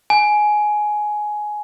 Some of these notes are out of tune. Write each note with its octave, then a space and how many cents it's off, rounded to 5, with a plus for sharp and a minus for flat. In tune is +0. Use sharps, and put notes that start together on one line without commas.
G#5 +15